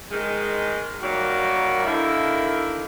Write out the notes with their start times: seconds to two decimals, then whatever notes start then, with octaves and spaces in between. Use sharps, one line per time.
0.11 G#2 D#3 G#3
1.01 D#3 F#3 G3 A#3 F#4
1.85 D3 D#3 A#3 E4